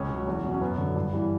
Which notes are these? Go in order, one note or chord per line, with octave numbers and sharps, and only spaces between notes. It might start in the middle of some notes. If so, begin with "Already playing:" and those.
Already playing: C#2 C#4
C#3 F#3
E2
B2 F#3
C#4
F#2 B3
D3 F#3
G2
E3 G3